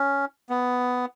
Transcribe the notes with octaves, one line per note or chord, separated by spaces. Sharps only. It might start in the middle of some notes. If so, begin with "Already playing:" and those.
Already playing: C#4
B3